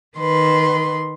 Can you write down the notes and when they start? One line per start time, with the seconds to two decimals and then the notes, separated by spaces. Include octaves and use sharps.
0.17 D#3 B4 C6